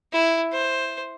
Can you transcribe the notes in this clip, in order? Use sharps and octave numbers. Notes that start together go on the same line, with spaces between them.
E4
C5